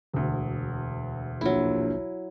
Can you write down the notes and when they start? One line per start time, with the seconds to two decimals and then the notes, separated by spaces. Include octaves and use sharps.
0.13 E1 D2
1.41 A#1 F#3 E4